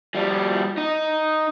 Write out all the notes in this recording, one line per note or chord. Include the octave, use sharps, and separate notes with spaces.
F3 G3
D#4